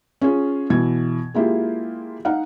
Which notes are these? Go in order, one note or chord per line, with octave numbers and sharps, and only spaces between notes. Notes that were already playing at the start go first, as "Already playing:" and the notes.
C#4 F4 G#4
B2 E3 G#6
G#3 A#3 E4 F4 G4
D#4 F5 F#5